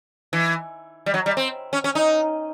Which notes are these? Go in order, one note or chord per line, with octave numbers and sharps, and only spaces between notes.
E3
G3
F#3
G3
C4
C#4
C#4
D#4